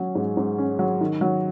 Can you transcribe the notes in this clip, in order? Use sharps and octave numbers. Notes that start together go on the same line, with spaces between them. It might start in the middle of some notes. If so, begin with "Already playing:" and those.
Already playing: F#3 C#4
G#2
G#2
C#4
F#3
D#3
F#3